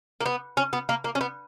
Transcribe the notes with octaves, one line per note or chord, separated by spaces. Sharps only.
A#3
B3
C#4
B3
A#3
A#3
C#4
B3